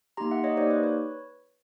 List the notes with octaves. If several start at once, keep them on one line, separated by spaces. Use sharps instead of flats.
A#3 D#4 G4 A#5 C6
E5 F#5
C#5 D#5
A#3 D#4 G4 C5 D5
B4 C#5
B4 C#5